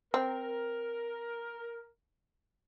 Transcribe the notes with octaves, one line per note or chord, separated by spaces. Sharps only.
C4 A#4